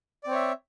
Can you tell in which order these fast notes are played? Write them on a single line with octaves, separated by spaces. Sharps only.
D5 C4 C#5 E5